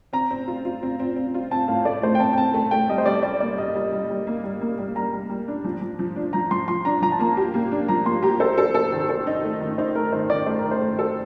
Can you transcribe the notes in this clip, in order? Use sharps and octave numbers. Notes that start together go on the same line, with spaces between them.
C4 A#5
C4
F4
F4
C4
C4
C4
F4
C4 A5
A2 F5
A3 D5
A3 C5
G5
C4 A5
G5
C4 A5
A3
A3 G5
G3 D#5
C5
G3 D5
G3 D5
A#3 D5
G3 D#5
G3
G3
G3
A#3
G3
A#3
G3
G3 A#5
G3
G3
D4
F3
F3
F3
D4
F3 A#5
F3 C6
F3 C6
D4 A#5
F3 A#5
A5
A#3 A#5
G4
A#3
D4
F3 A#5
A#3 C6
G4 A#5
A4 C5
A4
A4
D#3
A4
D#4
A3
D#3
D#4 C5
A3 A#4
D#3 C5
D#3 D5
A3 C5
A#4
D#3
C5
A3
A4